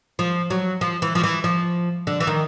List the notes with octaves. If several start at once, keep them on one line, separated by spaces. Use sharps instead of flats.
F3
F#3
F3
E3
F3
E3
F3
D3
E3
D#3